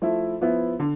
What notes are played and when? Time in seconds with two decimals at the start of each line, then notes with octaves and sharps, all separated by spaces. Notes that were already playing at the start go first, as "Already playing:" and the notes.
0.02 F3 A3 E4
0.41 F3 B3 E4
0.80 D3